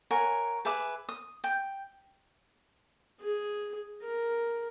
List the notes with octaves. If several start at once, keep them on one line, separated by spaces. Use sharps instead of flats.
A#4 C#5 F#5 G#5
G#4 B4 E5 D6
D#6
G5
G#4
A#4